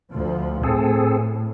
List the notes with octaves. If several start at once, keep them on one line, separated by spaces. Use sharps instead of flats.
D2 F3
A2 C4 G#4 A4